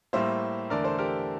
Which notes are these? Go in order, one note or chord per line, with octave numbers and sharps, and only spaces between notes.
A2 G3 A#3 C5 E5
E2 D3 A3 A#4 D5
A4 C5
G4 A#4